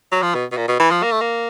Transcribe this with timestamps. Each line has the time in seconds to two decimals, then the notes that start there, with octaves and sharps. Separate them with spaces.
0.12 F#3
0.22 F3
0.34 B2
0.52 B2
0.57 A#2
0.68 B2
0.80 E3
0.91 F3
1.02 A#3
1.12 A3
1.21 A#3